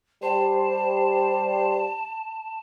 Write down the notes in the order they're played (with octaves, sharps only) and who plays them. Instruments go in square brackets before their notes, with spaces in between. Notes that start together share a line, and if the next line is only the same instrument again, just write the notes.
[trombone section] G3 G4 [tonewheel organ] C5 [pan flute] A5